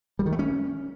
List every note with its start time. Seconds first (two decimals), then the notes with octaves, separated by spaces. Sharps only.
0.19 G3
0.26 D#3
0.32 A3
0.39 C#4